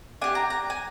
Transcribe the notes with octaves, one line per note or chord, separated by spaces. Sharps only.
D4 G4 G#5
A#5
A#5
G#5